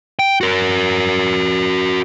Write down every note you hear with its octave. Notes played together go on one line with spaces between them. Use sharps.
G5
F#4 A#4